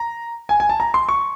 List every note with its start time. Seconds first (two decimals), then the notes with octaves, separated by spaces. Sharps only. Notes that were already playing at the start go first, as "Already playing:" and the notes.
Already playing: A#5
0.49 G#5
0.60 G#5
0.69 A5
0.80 A#5
0.94 C6
1.09 C#6